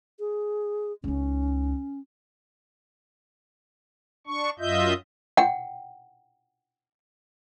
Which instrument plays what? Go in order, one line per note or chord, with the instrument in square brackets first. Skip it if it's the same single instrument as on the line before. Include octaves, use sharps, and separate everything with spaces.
[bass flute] G#4
[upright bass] C#2 D#4 [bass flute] C#4
[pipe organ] D4 C#6
F#2 F4 D#5 E5 G6
[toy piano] F#5 G5